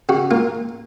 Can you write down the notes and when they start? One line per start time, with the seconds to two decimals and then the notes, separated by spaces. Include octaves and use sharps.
0.09 C#3 F#4
0.31 A#3 F4